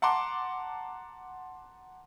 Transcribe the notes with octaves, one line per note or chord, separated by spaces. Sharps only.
F#5 A5 A#5 C6 D6